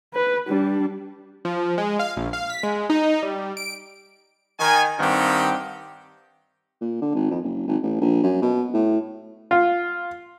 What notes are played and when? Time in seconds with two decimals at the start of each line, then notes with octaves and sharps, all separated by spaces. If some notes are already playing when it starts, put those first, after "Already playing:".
0.13 B4
0.48 G3 D4
1.45 F3
1.78 G#3
1.99 F5
2.17 A#1
2.33 F5
2.50 B6
2.63 G#3
2.90 D#4
3.23 G3
3.57 D7
4.60 D#3 G#5
5.00 G2 D#3 C4 G4 D#5 F#5
6.81 A#2
7.01 D3
7.14 G#1
7.31 F2
7.43 F#1
7.67 G#1
7.82 A1
8.01 A#1
8.23 F#2
8.42 B2
8.73 A2
9.51 F4